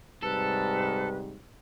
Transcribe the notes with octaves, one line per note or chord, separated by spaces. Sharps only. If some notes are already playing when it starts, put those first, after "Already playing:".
G#2 C3 G3 A4 B4